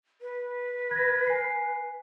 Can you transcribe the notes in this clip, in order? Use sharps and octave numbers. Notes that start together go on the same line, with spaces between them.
B4
G#6 A#6
G#5 C7